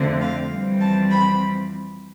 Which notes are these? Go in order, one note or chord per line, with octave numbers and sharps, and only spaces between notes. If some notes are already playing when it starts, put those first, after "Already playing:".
Already playing: F2 D3 A3 C4
F5
F2 E3 G3 C4
A5
B5